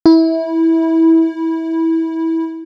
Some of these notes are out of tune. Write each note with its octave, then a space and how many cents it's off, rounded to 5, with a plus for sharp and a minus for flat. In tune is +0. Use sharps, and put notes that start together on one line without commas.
E4 -20